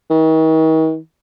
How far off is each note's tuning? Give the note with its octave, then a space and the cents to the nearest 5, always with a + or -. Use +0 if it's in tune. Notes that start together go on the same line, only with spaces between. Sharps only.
D#3 +40